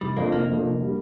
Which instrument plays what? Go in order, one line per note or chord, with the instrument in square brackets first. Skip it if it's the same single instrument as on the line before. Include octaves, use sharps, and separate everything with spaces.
[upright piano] F1 [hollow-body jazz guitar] G3
[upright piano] F2 F3 D4 [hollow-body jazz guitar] A#3
[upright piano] F1 [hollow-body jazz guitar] A#3
[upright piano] F2 F3 D4
F1
D3 G3